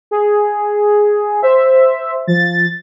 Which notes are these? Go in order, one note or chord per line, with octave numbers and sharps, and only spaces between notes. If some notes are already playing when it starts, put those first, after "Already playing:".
G#4
C5 E5
F3 A6